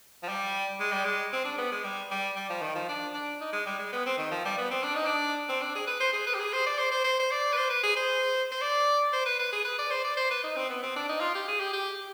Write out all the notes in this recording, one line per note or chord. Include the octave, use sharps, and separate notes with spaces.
F3
G3
G#3
G3
G#3
C4
D4
B3
G#3
G3
G3
G3
F3
D#3
F3
D4
D4
D#4
G#3
G3
G#3
B3
C4
D#3
F3
G3
B3
C4
D4
D#4
D4
C4
D4
G#4
B4
C5
G#4
B4
G4
G#4
C5
D5
C5
C5
C5
C5
D5
B4
C5
B4
G#4
C5
C5
D5
C5
B4
B4
G#4
B4
D5
C5
D5
C5
B4
D#4
C4
B3
C4
D4
D#4
F4
G4
G#4
G4
G4